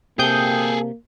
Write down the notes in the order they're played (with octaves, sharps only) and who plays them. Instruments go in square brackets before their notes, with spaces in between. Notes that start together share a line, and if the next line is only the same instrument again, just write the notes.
[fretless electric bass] C3 [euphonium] A#3 [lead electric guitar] G#4 A4 [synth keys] G5 D#6 G6